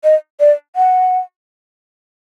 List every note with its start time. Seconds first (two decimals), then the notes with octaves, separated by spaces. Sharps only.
0.04 D#5
0.40 D5
0.76 F#5